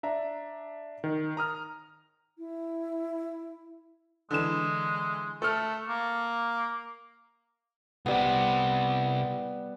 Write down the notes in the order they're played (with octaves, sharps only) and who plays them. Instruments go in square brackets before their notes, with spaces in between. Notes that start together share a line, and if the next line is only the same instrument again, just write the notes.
[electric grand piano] D4 E5 A#5
D#3
A#5 D#6 F6
[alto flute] E4
[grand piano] D3 E3 E7 [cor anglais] G#3
[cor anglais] A3 [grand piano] A4 F6
[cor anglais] A#3
[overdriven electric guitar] C2 C3 [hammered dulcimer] G3 B3